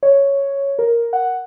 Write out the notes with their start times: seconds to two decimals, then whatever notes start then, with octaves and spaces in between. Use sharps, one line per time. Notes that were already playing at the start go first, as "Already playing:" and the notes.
0.03 C#5
0.79 A#4
1.13 F#5